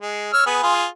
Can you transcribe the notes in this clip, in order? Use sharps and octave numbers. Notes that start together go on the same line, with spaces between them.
G#3
C#5 E6 F6
B3 G#4 B4
F4 G#4